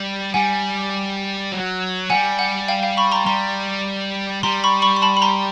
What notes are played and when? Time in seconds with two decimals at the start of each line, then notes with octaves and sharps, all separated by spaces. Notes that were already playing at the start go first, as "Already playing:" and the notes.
Already playing: G3
0.34 G3 F#5 G#5
1.52 F#3
2.10 G3 F#5 G#5
2.39 F#5
2.68 F5 G5
2.83 F5 G5
2.97 B5 C#6
3.12 A#5 C6
3.26 G3 A#5 C6
4.43 G3 A#5 C6
4.64 B5 C#6
4.82 B5 C#6
4.96 C6
5.02 A5 B5
5.17 B5
5.22 A#5 C6